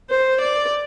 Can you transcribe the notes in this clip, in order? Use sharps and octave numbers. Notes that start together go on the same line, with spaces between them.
C5
D5